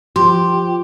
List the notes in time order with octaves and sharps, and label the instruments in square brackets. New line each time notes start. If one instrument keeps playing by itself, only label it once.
[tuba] F3 [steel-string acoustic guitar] G4 [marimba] C6